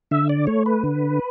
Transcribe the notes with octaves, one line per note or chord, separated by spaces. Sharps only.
D3 E5
D5
A3 C#5
B4
D3